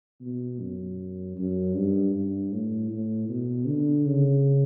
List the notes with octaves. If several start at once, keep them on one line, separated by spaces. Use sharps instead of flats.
B2
F#2
F#2
G2
G2
A2
A2
B2
D3
C#3